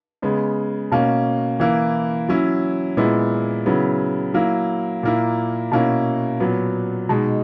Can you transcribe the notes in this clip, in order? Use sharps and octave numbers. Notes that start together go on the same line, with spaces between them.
C#3 G#3 B3
B2 A#3 C#4
E3 A#3 E4
F#3 C#4 E4
A#2 G#3 B3 E4
C#3 F#3 B3 E4
F#3 A#3 E4
A#2 A#3 E4
B2 A#3 C#4 E4
A#2 F#3 B3
B2 G#3 D#4